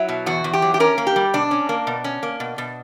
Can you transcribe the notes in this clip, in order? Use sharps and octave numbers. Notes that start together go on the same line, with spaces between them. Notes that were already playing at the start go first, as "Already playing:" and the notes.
Already playing: F#3 E4
B2
E2 F#4
E2
G4
F#3
G4
C#4 A#4
A#3
G4
G3
B2 D4
C#4
A#3
B2
C#4
A#3
B2
B2